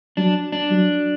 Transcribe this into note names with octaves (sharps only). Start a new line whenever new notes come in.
F#3 D4
D4
F#3